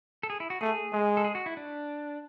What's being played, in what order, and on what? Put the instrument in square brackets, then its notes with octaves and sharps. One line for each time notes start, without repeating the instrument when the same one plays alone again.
[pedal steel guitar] A4
G#4
E4
F#4
[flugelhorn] A3 [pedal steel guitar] G#4
[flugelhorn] G#3
[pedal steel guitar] A4
G#4
F#4
E4
D4